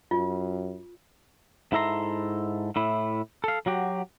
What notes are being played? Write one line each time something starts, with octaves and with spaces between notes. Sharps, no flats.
F#2 F4
G#2 E4 A4 E5 A#5 C6
A2 E4
A4 F5
F#3 F#4 G4